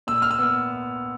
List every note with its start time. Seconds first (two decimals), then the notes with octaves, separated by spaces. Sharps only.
0.07 A#2 E6
0.22 F6
0.31 E6
0.39 B3